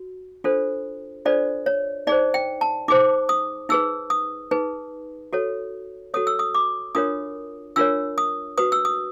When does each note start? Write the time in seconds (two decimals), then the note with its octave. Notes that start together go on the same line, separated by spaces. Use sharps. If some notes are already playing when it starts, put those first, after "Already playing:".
Already playing: F#4
0.44 D4 F4 A4 C5
1.25 D4 F4 A4 C5 D5
1.66 C#5
2.07 D#4 G#4 C5 D5
2.34 G5
2.61 A5
2.88 D#4 G#4 C5 D6
3.29 D#6
3.69 D#4 G#4 B4 E6
4.10 D#6
4.51 D#4 G#4 B4
5.33 F#4 A4 C#5
6.14 F#4 A4 C#5 D#6
6.27 E6
6.39 D#6
6.55 D6
6.95 D4 F4 A#4 C#5 D#6
7.76 D4 F4 A#4 C#5 E6
8.18 D#6
8.58 F#4 B4 D#6
8.72 E6
8.85 D#6